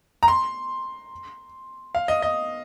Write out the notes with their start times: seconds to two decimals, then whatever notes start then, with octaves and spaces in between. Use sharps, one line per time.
0.23 A#5
0.28 C6
1.95 F5
2.08 D#5
2.22 D#5